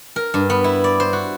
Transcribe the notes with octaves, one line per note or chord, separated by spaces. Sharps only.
A#4
G2
B3
E4
D5
C5
F#4